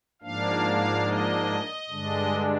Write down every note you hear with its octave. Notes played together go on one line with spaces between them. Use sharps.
G#2 F3 A#3 D4 F5
D#5
G2 D3 G#3 D4